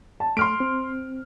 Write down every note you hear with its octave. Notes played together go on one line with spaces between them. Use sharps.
A5
A3 C6 F6 D7
C4